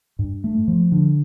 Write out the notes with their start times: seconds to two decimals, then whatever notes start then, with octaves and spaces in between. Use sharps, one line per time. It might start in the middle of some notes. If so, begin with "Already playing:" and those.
0.19 G2
0.44 A3
0.68 F3
0.92 D3